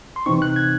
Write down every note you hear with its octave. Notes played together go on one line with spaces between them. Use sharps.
C6
C3 E3 C4 D#4 C#6
F#6
G#6